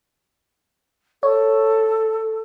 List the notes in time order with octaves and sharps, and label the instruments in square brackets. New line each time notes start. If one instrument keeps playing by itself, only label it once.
[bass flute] A4 [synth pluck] C#5